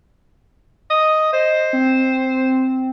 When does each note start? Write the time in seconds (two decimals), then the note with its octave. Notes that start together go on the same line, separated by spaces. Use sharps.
0.90 D#5
1.33 C5 D#5
1.73 C4